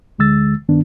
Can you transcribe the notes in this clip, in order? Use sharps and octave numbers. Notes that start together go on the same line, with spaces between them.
D2 D3 G#3 E6 A6
G2 D#3 B3 D4